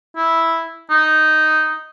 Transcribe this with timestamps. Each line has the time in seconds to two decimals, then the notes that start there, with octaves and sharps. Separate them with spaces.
0.17 E4
0.90 D#4